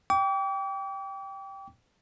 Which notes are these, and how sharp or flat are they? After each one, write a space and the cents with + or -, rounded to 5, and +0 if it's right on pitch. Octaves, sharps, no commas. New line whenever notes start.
G5 +0 D6 -40